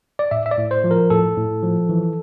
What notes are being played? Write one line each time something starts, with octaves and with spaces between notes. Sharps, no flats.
D5
A2 E5
E5
D5
A2
C5
F3
A#4
A2 A4
A2
F3
E3